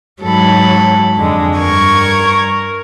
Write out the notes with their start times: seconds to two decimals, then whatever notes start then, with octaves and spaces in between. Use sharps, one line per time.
0.22 G#2 F#3 A4 B5
1.17 F2 D3 G#3
1.58 G2 A#4 C#6 G#6